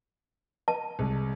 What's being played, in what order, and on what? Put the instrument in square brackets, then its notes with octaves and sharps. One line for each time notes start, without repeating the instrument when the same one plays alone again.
[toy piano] A5
[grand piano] C2 G#3